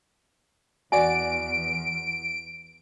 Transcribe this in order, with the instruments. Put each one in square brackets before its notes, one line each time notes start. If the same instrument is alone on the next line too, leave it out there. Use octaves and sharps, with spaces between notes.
[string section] E2 [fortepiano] F#4 D5 [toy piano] G#5 [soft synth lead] D7